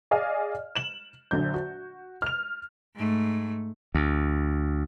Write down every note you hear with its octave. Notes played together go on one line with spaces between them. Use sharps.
G#4 D5 D#5 F5 G#5 F6
E7 F#7
A#1 D3 F#3 G6
F#4
F6 F7
G#2 A3
D2